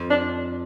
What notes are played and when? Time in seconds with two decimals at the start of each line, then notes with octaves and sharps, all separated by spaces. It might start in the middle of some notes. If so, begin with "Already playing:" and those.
Already playing: F2
0.10 D4